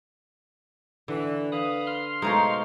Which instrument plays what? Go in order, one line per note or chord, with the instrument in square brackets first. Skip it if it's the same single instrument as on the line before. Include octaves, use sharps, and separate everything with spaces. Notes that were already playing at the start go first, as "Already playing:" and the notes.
[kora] D3 [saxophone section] E3
[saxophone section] B4 F5 [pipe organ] D#6
[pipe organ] C6 F6
[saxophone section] B2 F5 [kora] G#3 A3 C#5 [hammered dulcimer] D#4 C5 C#6